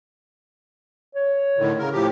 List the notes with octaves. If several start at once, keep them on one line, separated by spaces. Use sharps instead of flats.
C#5
A2 D3 D#3
C#3 A#4
A2 F3 G4